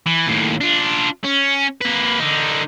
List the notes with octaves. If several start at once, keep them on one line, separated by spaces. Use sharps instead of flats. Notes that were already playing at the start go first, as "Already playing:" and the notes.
E3
D#2 A2
D4 F4
C#4
A#3 B4
D3 D#4